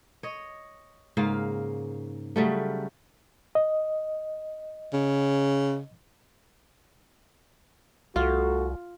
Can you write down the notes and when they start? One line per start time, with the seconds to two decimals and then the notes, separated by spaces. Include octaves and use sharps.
0.23 C#5 D#5
1.17 G#2 C#3 A#3 F5
2.36 C#3 F#3 G3 A3
3.55 D#5
4.93 C#3
8.16 C2 A3 F4 F#4 A4